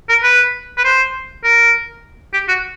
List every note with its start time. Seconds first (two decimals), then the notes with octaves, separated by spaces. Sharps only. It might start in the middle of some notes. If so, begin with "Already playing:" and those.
0.09 A#4
0.23 B4
0.78 B4
0.84 C5
1.44 A#4
2.34 G4
2.48 F#4